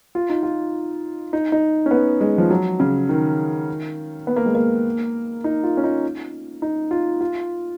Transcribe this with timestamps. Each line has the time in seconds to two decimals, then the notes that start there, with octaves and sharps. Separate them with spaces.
0.15 F4
0.29 D#4
0.43 F4
1.33 D#4
1.52 D#4
1.86 C#4
1.91 B3
2.21 G#3
2.38 F3
2.50 F#3
2.80 C#3
3.09 D#3
4.27 B3
4.36 A#3
4.46 G#3
4.55 A#3
5.44 D#4
5.64 F4
5.77 C#4
5.84 D#4
6.62 D#4
6.91 F4
7.21 F4